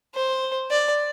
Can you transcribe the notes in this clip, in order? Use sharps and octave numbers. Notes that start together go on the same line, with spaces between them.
C5
D5